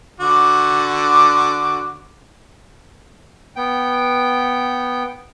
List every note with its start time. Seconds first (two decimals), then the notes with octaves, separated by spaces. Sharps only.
0.20 D3 F#4 D6
3.56 B3 G5